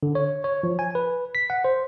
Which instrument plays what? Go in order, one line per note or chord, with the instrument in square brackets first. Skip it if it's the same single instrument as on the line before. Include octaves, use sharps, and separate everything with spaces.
[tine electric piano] D3
C#5
C#5
F3
G#5
B4
B6
F#5
C5